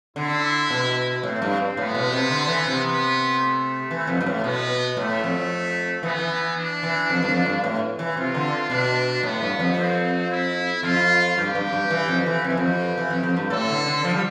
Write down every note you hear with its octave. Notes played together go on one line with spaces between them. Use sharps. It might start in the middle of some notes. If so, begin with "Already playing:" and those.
D3 E4
B2
A2 C4
G2
A2 B3
B2
C3
D3
E3
C3
B3
A3
E3
F2
G2
A2
B2 B3
A2 A3
F2
E3 B3
E3
D4
E3
F2
G2
F2
G2
A2
E3
C3 F4
D3
B2 D4
A2 B3
G2
F2
C4
E4
F2 F4
G2 G4
G2
G2
E3
F2
E3
F2 G4
E3
F2
E3
F2
F2
G2
A2 A4
D3
D3
F3
G3